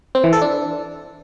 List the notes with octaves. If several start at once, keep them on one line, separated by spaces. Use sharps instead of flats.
C4
E3
A4
D4